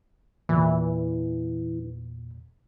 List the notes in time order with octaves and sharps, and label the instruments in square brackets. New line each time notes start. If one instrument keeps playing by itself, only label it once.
[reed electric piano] E2 A#2 [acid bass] E3